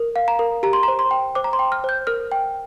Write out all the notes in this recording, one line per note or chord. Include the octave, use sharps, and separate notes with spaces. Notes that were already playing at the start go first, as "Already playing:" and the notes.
Already playing: A#4
F5
A#5
A#4
G4 A#5
C6
C5 A#5
C6
G5
C5 D6
A#5
C6
G5
F6
C5 G6
A#4 F6
G5